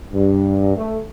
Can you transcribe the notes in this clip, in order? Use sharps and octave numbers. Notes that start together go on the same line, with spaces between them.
G2
A3